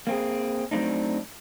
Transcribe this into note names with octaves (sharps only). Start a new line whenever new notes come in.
A#3 C4 G#4
F#3 A3 C4 D4 D#4